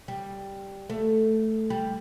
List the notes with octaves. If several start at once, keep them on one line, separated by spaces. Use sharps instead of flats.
G3
A3
G3